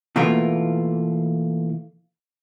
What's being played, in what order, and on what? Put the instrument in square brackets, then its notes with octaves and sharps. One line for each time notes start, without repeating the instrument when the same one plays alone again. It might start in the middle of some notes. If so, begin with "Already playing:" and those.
[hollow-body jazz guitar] B2 E3 A3 A#3 F4 A#4